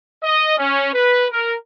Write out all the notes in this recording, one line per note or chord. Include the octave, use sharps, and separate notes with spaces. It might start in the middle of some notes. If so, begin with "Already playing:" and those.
D#5
C#4
B4
A#4